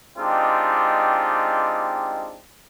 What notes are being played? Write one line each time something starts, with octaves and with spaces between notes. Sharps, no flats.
G#3 C4 D4 D#4 F4 G4